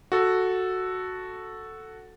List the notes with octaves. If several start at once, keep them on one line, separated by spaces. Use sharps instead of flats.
F#4 A4